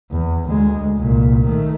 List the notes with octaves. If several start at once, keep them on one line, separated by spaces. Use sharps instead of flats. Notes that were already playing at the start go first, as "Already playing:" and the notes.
E2
D2 G#3
C2 A#2
D#3 A3